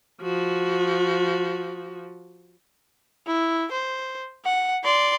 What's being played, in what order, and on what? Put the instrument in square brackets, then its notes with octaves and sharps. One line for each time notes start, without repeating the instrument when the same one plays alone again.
[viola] F3 F#4
[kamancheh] E4
C5
F#5
D5 C6